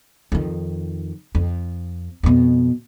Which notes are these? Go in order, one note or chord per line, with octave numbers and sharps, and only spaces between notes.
F2 D#3
F2
F2 B2